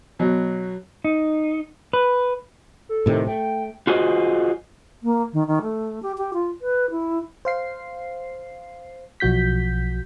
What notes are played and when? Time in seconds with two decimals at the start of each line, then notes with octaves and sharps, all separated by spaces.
0.19 B2 F#3
1.04 D#4
1.93 B4
2.89 A4
3.06 A2 C3 D#3
3.27 A3 G5
3.87 F4 F#4 G#4 C5 D#5
5.03 A#3
5.33 D#3
5.48 D#3
5.62 A3
6.03 G4
6.18 G4
6.34 F4
6.61 B4
6.91 E4
7.45 C5 F5 C7
9.20 B1 F3 F#4 G6 B6